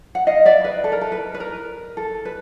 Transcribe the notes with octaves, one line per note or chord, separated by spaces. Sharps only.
F#5
D#5 F5
D5 E5
B4
A4
A#4
A4
B4
B4
A#4
A4
B4